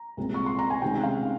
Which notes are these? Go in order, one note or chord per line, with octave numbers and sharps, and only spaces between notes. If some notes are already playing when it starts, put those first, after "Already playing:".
Already playing: A#5
C2 A#2 G#3 C4
C#6
C6
A#5
G#5
C3 D#3 G#3 C#4 G5
F5